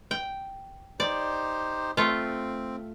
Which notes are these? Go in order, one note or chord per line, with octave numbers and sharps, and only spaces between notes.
G5
D#4 G4 C5 D5
A3 C4 F4